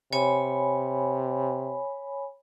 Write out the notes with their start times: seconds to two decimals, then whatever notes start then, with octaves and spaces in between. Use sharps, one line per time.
0.13 C3 C#5 G#5 B5